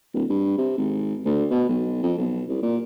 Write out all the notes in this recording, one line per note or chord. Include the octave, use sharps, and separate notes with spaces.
D1
G2
C3
G#1
D2
B2
B1
F2
B1
C2
A#2